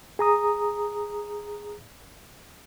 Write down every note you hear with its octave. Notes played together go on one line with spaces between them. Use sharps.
G#4 A#5 D#6